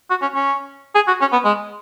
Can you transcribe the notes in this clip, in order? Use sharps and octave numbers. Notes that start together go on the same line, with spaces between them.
F#4
C#4
C#4
G#4
F#4
C#4
B3
G#3